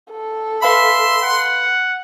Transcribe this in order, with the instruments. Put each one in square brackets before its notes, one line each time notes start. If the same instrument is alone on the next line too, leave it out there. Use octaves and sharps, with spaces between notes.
[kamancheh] A4
[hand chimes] B4 F5 B5 [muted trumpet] E5 [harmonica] C6
[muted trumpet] F#5